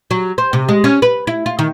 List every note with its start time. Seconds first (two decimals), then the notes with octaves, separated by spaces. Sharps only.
0.11 F#3
0.38 C5
0.53 C3
0.69 G#3
0.84 C#4
1.02 B4
1.27 E4
1.46 F4
1.59 D#3